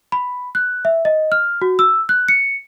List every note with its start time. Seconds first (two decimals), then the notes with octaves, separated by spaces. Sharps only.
0.12 B5
0.55 F#6
0.85 E5
1.05 D#5
1.32 F6
1.62 F#4
1.79 E6
2.09 F#6
2.29 C#7